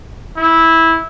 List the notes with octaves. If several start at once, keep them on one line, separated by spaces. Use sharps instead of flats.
E4